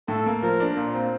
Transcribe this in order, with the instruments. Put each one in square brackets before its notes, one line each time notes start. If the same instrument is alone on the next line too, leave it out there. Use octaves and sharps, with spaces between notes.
[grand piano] A2 [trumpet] A4
[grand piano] A#3
[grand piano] F3 [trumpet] A#4
[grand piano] D4
[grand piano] A#2 [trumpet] F4
[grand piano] C4